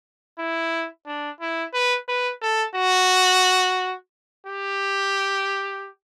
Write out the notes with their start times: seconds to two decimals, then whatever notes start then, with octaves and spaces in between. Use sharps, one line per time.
0.39 E4
1.06 D4
1.41 E4
1.74 B4
2.08 B4
2.42 A4
2.76 F#4
4.46 G4